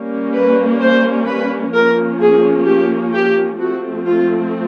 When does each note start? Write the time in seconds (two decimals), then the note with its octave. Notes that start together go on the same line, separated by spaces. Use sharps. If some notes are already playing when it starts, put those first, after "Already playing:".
Already playing: G3 A#3 C#4
0.35 B4
0.81 C5
1.28 B4
1.74 F3 A#3 C#4 A#4
2.21 G#4
2.67 G4
3.14 G4
3.60 F3 A3 C4 F#4
4.07 F4